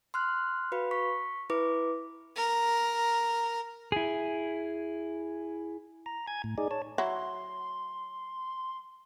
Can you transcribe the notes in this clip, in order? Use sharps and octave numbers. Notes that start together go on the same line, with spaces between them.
C6 F6 F#6
F#4 B4 F5 B5
C#6 B6
E4 B4 D6
A#4
E4 G#4
A#5
G#5 G#6
A2
D#4 G#4 D5
C#5 A5
F#3 E4 C6